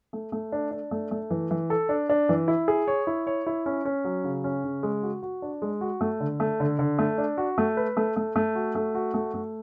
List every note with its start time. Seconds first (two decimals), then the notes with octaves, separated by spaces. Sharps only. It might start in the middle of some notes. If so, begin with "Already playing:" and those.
0.13 A3
0.32 A3
0.52 D4
0.71 D4
0.91 A3
1.11 A3
1.30 E3
1.51 E3
1.70 A4
1.89 D4
2.09 D4
2.29 E3
2.48 E4
2.68 G#4
2.87 C#5
3.07 E4
3.27 C#5
3.47 E4
3.66 C#4
3.85 C#4
4.05 F#3
4.24 C#3
4.44 C#4
4.64 C#3
4.83 G#3
5.03 F#4
5.23 F#4
5.42 D4
5.62 G#3
5.81 F#4
6.01 A3
6.20 D3
6.40 A3
6.60 D3
6.79 D3
6.99 A3
7.18 D4
7.38 F#4
7.58 A3
7.77 B4
7.97 A3
8.16 A3
8.36 A3
8.55 F#4
8.75 A3
8.95 F#4
9.14 A3
9.34 A3